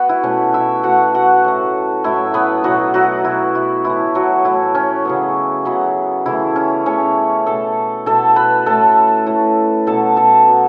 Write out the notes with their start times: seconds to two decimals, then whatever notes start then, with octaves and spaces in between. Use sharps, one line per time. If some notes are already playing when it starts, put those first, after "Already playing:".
Already playing: B3 F#4 B4
0.09 E4
0.24 B2 A3 C#4
0.54 E4 E5
0.83 B2 A3 F#4 F#5
1.14 F#4 F#5
1.44 A2 F#3 A3
2.04 A2 F#3 A3 E4 E5
2.34 B3 B4
2.64 B2 F#3 B3 F#4
2.94 F#3 F#4
3.24 B2 B3 E4
3.55 E4
3.84 A2 E3 A3 E4
4.15 F#3 F#4
4.45 A2 E3 A3 E4
4.75 C#4
5.05 C#3 F#3 B3
5.65 C#3 F#3 B3
6.26 C#3 E3 A3 E4
6.56 C#4
6.86 C#3 E3 A3 C#4 C#5
7.46 B2 A3 A4 A5
8.06 B2 A3 A4 A5
8.36 B4 B5
8.66 A2 A3 A4 A5
9.26 A2 A3
9.87 B2 F#3 B3 A4 A5
10.17 A4 A5
10.47 B2 F#3 B3